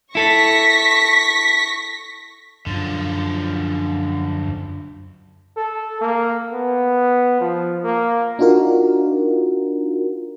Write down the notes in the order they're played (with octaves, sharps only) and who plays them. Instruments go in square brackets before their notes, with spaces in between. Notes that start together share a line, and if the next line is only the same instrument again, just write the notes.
[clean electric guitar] E4 A4 [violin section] C#6 A#6 B6
[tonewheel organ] F#2 [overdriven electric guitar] D3 F3
[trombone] A4
A#3
B3
F3
A#3
[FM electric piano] D4 D#4 F4 F#4 A#4